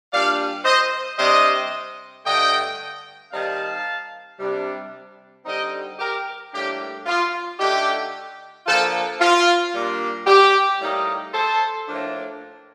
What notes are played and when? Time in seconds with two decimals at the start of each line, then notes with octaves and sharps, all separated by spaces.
0.11 A#2 G3 D4 D5 F5
0.64 C5 D#5
1.18 C3 G3 D4 C5 D#5
2.25 G2 D3 A3 D#5 G5
3.31 D#3 G3 C4 D#4 F5 A5
4.39 C3 G3 D4
5.45 D3 G3 C4 D#4 D#5 G5
5.99 G4 A#4
6.52 A2 G3 A#3 D4 G4
7.06 F4
7.59 D3 A3 D#4 G4
8.66 D3 F3 A#3 F4 A4
9.20 F4
9.73 A#2 G3 A#3 D4
10.26 G4
10.79 A2 G3 A#3 D#4
11.33 A4 C5
11.87 A2 F3 A#3 D4